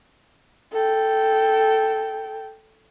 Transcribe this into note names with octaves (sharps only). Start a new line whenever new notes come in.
A4 G5